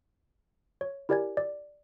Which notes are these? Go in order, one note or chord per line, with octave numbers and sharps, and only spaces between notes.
C#5
E4 G4 A#4 D5 G#5 G#6
D5